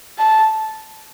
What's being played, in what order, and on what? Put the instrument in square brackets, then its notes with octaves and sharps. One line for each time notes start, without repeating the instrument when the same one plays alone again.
[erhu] A5